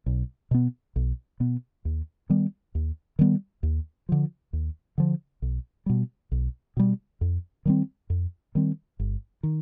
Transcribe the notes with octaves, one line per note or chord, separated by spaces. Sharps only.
B1
B2 B3
B1
B2 B3
D#2
D#3 G3 B3
D#2
D#3 G3 B3
D#2
D3 F3
D#2
D3 F3
B1
B2 G3
B1
B2 G3
F2
D#3 G3 C4
F2
D#3 G3 C4
G1
D#3